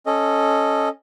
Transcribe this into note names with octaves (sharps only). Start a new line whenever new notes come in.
C#4 A4 D#5